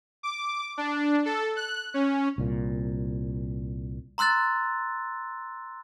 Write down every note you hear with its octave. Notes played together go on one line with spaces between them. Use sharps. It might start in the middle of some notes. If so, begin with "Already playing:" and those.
D6
D4
A4
F#6
C#4
C2 A#2
A#5 C6 E6 F#6 A6